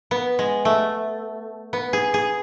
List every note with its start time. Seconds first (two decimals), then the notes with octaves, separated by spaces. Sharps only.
0.11 B3
0.39 G#3
0.65 A3
1.73 B3
1.93 G#4
2.14 G#4